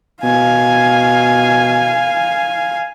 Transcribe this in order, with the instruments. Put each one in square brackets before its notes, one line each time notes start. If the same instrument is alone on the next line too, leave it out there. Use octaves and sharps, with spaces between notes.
[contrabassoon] B2 [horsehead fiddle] F5 G#5